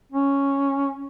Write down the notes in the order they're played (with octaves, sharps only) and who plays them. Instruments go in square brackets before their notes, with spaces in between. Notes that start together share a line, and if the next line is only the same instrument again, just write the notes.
[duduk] C#4